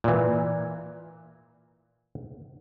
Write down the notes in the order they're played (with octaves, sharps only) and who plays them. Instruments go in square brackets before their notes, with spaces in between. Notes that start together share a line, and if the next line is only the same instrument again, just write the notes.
[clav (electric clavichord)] A#2 E3